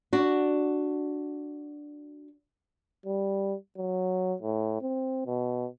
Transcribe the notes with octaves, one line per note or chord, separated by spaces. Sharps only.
D4 F#4
G3
F#3
A2
C4
B2